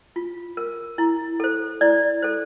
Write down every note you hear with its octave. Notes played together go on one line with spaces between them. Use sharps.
F4
A#4
E4
A4 C5
E4 D5
A4 C5